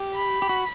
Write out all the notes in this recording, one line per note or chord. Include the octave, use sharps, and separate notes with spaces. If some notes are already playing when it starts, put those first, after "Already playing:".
Already playing: G4
B5
G4
F#4